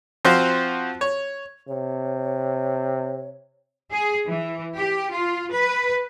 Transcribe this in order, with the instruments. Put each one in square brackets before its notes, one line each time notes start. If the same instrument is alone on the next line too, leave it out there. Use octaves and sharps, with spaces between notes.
[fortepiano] F3 C4 F4 F#4 C5
C#5
[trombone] C3 [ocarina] C#5
[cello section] G#4
E3
G4
F4
B4